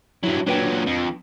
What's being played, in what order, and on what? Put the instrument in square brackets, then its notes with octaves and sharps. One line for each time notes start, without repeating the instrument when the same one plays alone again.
[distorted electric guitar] G2 F#3 [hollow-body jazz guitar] E4
[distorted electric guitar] A#2 F#3 [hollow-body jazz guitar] D4 B4 G5
[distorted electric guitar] F2